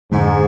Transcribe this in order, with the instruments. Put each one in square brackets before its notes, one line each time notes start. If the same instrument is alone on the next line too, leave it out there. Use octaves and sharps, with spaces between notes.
[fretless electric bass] F2 D3 G#3 [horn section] G#2